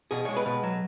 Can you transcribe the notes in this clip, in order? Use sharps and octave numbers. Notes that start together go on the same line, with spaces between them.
B2 G#4
G#3 C#5
B4
B2
F#3